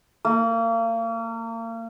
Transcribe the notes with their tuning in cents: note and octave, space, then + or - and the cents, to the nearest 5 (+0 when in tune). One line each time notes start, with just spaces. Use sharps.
A#3 -35